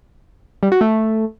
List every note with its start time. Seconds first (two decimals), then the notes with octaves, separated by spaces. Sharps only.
0.63 G3
0.72 F#4
0.81 A3